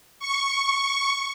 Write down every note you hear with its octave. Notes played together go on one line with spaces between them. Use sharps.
C#6